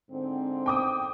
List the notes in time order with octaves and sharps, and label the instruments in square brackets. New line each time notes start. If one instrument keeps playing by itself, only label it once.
[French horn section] G#2 D3 C4
[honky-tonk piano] G5 D6 D#6